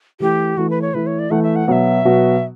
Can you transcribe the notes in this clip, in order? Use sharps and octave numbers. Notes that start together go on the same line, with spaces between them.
E3 A3 E4 G4
E3 A3 E4 F#4
B4
C#5
E3 A3 E4 B4
C#5
D5
E3 A3 E4 F#5
E5
F#5
B2 F#3 B3 F#4 E5 F#5
B2 F#3 B3 F#4